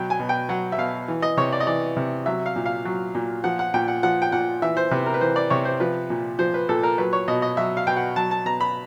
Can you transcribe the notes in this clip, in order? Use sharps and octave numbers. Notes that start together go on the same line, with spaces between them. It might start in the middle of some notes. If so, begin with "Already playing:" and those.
Already playing: B2 F#3 G5
G#5
B2
G5
F#3 F#5
E5
B2 F5
E3
D#5
C3 C#5
D5
D#5
E3 D5
C3
F#3 E5
F5
A#2
F5
F#3
A#2
F3 F#5
F#5
A#2 G5
F#5
F3 F#5
G5
A#2 F#5
E3 E5
C5
C3 B4
A#4
B4
E3 C5
D5
C3 C#5
C5
F3 B4
A#2
F3 C5
B4
A#2 A4
A#4
F#3 B4
C#5
B2 D#5
D#5
F#3 E5
F5
B2 G5
F#5
F#3 A5
A5
B2 A#5
B5